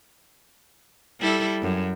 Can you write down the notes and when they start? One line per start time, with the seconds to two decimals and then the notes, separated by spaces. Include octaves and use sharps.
1.21 G3 E4 A4
1.62 F#2